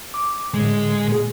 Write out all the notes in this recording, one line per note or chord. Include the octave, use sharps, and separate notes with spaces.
D6
A2 D3 G#3
A#2 G#4